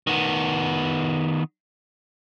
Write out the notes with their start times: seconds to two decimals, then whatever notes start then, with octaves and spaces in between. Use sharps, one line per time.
0.07 D#3 B3